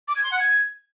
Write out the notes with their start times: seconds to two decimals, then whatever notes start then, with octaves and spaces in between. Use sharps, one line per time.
0.08 D6
0.16 G#6
0.24 C6
0.32 F#5
0.39 G#6